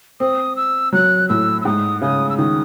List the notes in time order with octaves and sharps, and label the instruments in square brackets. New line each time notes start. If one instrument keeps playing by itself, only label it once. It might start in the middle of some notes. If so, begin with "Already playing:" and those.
[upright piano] C4 [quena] D#6
[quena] E6
[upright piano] F#3 [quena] F#6
[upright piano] A2 [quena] E6
[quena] E6
[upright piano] G#2 [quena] D#6
[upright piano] C#3 [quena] D#6
[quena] E6
[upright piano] D#3 [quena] D#6